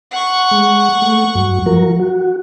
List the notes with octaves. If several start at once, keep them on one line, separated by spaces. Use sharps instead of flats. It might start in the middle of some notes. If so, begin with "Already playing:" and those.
F#5 C#6
G#3
A3
G2 F#3
F3 F#3 A#4
F#4